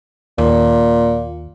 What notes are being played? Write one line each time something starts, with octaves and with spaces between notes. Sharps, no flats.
D#2 A#2